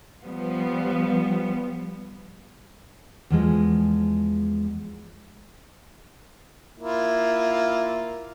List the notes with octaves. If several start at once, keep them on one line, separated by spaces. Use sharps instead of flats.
F3 G3 B3
E2 F3 G#3
A#3 E4 F4